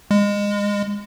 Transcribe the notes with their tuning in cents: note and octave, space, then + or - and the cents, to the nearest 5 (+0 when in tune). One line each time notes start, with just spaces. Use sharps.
G#3 -25